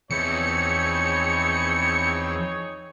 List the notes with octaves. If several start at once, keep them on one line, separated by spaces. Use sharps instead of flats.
E2 E3 F3 C4 D#4 G#4 C#5 C#7